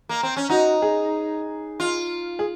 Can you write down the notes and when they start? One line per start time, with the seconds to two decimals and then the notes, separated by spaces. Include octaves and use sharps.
0.09 A#3
0.23 C4
0.37 C#4
0.49 D#4 F#4
0.82 G#4
1.80 F4
2.39 G#4